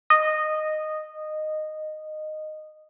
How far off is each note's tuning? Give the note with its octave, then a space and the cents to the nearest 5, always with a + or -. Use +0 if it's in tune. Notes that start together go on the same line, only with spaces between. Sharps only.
D#5 -10